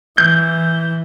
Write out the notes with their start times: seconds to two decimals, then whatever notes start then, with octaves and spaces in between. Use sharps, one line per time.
0.18 E3 G6